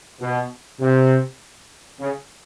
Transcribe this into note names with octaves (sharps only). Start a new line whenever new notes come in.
B2
C3
C#3